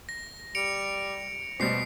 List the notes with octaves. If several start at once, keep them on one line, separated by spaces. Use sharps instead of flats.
A#6
G3 C#7 D7 F7
B2 G3 C5 B6 C7